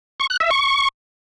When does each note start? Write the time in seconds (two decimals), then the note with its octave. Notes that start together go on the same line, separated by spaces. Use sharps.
0.20 C#6
0.30 F#6
0.40 E5
0.51 C#6